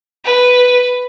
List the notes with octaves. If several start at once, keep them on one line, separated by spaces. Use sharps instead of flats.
B4